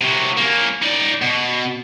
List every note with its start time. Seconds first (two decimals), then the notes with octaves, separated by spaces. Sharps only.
0.01 C3 F#3
0.37 A#3 C#4
0.82 D#4 D5
1.22 B2